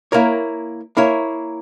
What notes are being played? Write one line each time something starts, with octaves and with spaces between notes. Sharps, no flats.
A#3 E4 A#4 C#5
A#3 E4 A#4 C#5